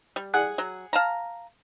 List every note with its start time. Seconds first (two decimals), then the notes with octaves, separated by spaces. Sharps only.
0.16 G3
0.34 G#4 F#5
0.58 F#3
0.93 F5 A5 A#5